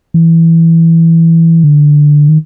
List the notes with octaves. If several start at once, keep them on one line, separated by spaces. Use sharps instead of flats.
E3
D3
D#3